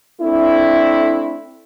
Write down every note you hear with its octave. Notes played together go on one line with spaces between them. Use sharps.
A3 C4 D4 E4